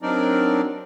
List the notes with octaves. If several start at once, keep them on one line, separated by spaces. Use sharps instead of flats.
F#3 C4 D4 D#4 A#4 D5